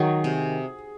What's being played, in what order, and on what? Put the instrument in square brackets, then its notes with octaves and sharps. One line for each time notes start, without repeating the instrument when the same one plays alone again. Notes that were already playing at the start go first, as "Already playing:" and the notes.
Already playing: [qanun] D#3 F#3 [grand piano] G#4
[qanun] C3